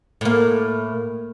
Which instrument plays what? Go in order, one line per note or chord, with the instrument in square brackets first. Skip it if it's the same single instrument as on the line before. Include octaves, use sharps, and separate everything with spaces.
[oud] A2 A#3